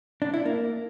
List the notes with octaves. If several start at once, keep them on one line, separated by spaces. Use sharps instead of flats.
D4
E4
A#3